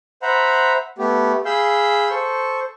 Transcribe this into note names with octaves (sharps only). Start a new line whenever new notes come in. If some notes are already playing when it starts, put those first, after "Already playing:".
C5 E5 F#5 A#5 B5
A3 B3 G4
G#4 F5 B5 E6 G6
A4 C5 C#6